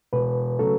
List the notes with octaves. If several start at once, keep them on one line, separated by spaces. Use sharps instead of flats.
E1 B4
C#3 F#3 A3 A4